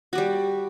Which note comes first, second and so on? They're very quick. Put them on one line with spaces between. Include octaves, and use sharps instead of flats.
F#4 G4 G3